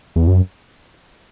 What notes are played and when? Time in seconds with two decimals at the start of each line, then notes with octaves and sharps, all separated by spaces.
0.16 E2
0.27 F#2